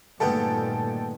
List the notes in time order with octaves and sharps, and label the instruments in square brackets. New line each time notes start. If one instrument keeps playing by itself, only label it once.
[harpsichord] D2 G#3 B3 [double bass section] G2 A#2 D#3 [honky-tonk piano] A4 G5